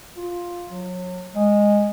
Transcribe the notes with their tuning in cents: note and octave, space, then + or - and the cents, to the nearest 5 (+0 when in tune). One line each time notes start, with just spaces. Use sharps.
F4 +5
F#3 -30
G#3 -10